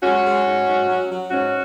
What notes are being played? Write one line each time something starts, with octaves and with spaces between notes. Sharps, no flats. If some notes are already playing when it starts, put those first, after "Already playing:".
G#3 C#4 F#4
G#3
G#2
G#2
F#3
F#3
G#2 C#4 F#4